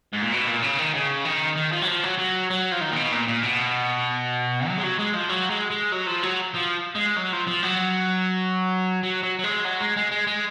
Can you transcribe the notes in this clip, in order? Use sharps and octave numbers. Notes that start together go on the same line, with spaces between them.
G#2
A#2
B2
A#2
C#3
D#3
C#3
D#3
D#3
F3
F#3
F3
F#3
F#3
F#3
F3
D#3
A#2
B2
A#2
A#2
B2
F#3
G#3
F#3
G#3
F3
F#3
G#3
G#3
F#3
F3
F#3
F3
G#3
F#3
F3
F3
F#3
F#3
F#3
F#3
G#3
F#3
G#3
G#3
G#3
G#3